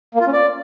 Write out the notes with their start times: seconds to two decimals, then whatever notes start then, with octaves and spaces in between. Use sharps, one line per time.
0.15 A#3
0.21 F4
0.27 C#4
0.33 D5